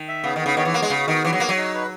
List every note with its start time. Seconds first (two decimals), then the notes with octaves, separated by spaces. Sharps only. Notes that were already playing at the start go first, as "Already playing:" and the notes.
Already playing: D#3
0.08 E5
0.24 C#3 B3
0.36 D#3
0.40 B3
0.46 C#3
0.57 D#3 C#5
0.65 E3
0.74 A#3 B3
0.82 G#3
0.90 C#3 F#4
1.08 D#3 B3
1.24 E3 C#5
1.33 F#3
1.40 A#3 C#5
1.49 F#3
1.57 D#4
1.74 B4